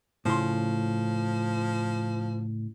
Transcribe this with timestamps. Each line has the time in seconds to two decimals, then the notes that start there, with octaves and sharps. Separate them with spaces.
0.25 A2 C#3 F3 C6